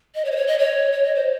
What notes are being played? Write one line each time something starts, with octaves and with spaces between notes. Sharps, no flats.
D#5
C#5
C5
C#5
D#5
C#5
C#5
D#5
C5